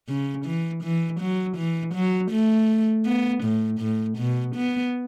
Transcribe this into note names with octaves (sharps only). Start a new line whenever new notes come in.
C#3
E3
E3
F#3
E3
F#3
A3
B3
A2
A2
B2
B3